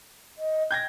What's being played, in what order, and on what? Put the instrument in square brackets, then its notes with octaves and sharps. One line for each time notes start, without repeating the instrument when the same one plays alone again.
[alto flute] D#5
[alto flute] G5 [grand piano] G6 G#6 A#6